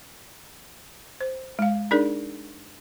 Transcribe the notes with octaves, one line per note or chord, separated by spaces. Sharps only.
C5
G#3 F5
D4 D#4 G#4 A#4 D5